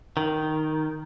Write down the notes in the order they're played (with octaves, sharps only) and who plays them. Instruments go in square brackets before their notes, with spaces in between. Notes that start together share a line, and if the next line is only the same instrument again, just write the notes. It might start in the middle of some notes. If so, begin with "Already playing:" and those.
[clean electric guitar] D#3